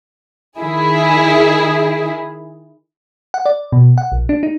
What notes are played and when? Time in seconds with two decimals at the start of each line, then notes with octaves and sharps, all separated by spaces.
0.59 D#3 E4 G#4
3.34 F#5
3.46 D5
3.72 B2
3.98 F#5
4.12 A#1
4.29 D4
4.43 D#4